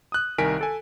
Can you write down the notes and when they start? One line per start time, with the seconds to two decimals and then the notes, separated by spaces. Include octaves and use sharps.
0.12 D#6 F#6
0.38 C2 D#3 A#4 G#5 B6 D7
0.61 A4 G#5